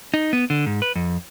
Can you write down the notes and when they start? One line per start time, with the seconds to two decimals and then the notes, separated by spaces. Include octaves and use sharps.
0.14 D#4
0.33 B3
0.50 D3
0.66 G#2
0.82 B4
0.96 F2